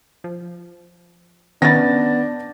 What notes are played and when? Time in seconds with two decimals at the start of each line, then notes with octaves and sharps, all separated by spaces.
0.24 F3
1.62 D#3 B3 C#4 D4 B4 A6 A#6